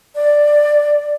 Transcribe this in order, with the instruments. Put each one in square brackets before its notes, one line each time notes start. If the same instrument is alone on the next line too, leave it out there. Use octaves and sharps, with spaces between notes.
[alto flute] D5